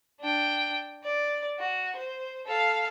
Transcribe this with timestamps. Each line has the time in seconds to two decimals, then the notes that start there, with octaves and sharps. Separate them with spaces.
0.20 D4 G5
1.03 D5
1.59 F#4
1.96 C5
2.46 A4 F5